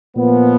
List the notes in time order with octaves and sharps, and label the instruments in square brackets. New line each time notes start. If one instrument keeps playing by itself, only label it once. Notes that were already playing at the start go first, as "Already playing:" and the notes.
[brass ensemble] A#2 F3 B3